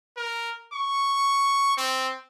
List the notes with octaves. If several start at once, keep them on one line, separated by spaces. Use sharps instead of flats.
A#4
C#6
C4